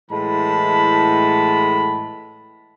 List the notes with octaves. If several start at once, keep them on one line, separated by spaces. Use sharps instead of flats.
A2 E3 G#3 A5 B5